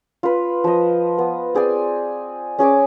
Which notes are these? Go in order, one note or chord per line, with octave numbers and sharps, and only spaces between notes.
F4 B4
F3 D#5
B3
C4 G#4 D5 G#5
C#4 G#4 G#5 D6